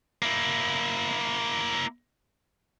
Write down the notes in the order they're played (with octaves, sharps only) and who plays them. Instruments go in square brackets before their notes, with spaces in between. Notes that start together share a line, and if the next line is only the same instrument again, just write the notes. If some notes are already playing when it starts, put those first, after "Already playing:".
[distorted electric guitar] A#3 E4